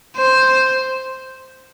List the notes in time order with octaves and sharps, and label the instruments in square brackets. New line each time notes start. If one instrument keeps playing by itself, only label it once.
[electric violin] C5